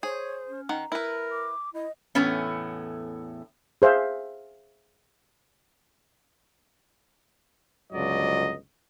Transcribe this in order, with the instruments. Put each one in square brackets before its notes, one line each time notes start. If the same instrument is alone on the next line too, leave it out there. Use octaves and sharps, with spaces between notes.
[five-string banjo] G#4 [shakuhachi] C5 [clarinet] C#5
[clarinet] C#4
[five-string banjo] D#3 F#5 [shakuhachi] A#5
[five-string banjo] E4 B4 [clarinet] A#4
[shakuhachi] D6
[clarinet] E4 [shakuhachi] D#5
[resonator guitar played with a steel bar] E2 A2 A3 B3 C#4
[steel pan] G#4 C5 E5 F5
[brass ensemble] G1 C#2 F#3 D5 D#5